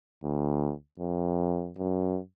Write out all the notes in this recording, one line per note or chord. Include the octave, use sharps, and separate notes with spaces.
D2
F2
F#2